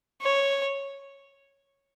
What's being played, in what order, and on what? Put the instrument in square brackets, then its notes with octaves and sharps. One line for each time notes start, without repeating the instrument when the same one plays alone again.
[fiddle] C#5